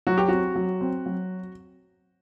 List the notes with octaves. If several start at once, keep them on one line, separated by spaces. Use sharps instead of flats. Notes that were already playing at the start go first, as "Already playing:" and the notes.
F#3 F#4
G4
C4 F#4
F#3
C4
F#3